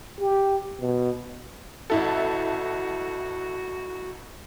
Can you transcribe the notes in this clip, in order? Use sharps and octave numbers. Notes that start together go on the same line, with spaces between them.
G4
B2
A1 E4 F#4 A4